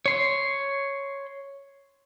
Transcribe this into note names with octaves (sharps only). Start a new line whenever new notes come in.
C#5 C6